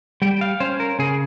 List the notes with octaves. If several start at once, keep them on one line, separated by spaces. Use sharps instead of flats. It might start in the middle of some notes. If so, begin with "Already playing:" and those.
G3 G5
F5
C#4 C5
A#4
C#3 G#4